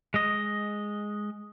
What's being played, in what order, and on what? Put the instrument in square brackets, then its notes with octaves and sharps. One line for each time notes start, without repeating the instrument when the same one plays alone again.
[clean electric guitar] G#3 D#5